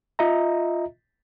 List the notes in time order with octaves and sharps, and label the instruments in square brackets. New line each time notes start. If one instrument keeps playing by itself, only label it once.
[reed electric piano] F4 D#5 E5 A#5